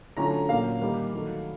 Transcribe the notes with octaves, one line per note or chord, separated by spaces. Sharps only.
D3 F#3 A3 C#4 F4 A#5
A#2 F#3 A#3 C#4 F5
D#3 G3 A#3 D#4
D#3 F#3 A3